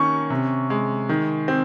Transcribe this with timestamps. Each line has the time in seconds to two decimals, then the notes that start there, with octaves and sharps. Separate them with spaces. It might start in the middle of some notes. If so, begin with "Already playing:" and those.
Already playing: D#3 A#3 C#4 C#6
0.30 C3
0.70 G#3
1.09 D#3
1.48 C4